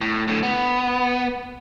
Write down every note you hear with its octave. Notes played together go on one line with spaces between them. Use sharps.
A2
A2 D3
B3